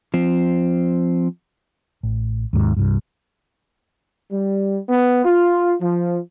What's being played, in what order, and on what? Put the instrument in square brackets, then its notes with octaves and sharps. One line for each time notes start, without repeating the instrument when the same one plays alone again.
[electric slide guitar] F3 C4
[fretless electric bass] A1
D#2 G#2
C2 G2
[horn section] G3
B3
F4
F3